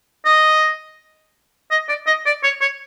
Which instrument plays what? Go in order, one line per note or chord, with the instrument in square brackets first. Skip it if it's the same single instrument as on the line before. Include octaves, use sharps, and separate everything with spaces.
[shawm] D#5
D#5
D5
D#5
D5
C#5
C#5